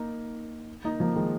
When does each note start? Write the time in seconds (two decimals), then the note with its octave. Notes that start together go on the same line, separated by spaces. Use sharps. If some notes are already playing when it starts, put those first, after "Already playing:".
Already playing: A#3 D#4
0.84 A#3 D#4
1.00 F3 A#3
1.16 D#3 G#3